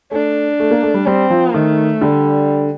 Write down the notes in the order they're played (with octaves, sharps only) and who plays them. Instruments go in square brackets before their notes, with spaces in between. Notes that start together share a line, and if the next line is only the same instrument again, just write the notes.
[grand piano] A3 [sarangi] D4
[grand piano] A3
A#3
A3
G3
[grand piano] G3 [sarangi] C4
[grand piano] F3
[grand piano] D#3 [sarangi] A3
[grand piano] D3 [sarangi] G3